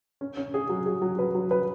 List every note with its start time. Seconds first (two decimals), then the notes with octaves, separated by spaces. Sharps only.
0.21 C#4
0.37 C#4
0.54 G#4
0.69 F#3
0.86 G#4
1.02 F#3
1.19 B4
1.35 F#3
1.51 B4